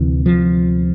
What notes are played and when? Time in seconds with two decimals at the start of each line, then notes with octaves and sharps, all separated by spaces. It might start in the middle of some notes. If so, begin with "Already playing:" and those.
Already playing: D2 C3 E3
0.26 F3